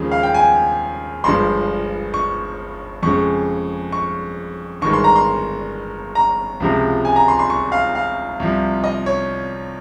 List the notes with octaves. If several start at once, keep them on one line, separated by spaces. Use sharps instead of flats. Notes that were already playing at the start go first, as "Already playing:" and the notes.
Already playing: D#2 C#3 F3 G#3
F5
G5
G#5
G1 G2 F3 G#3 C6
C#6
F2 C#3 G#3 C#6
C#6
G1 G2 D#3 G#3 C#6
C6
A#5
C6
A#5
C#2 C3 F3 G#3
G#5
A#5
C6
C6
C#6
F5
F5
C2 C3 F3
D#5
C#5